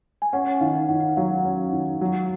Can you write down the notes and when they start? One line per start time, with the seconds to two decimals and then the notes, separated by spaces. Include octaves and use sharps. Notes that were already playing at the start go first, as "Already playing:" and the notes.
0.22 G#5
0.33 C#4 F#5
0.61 D#3 F5
0.89 D#3 F#5
1.17 F#3 F5
1.44 C#4
1.72 D#3
2.01 F#3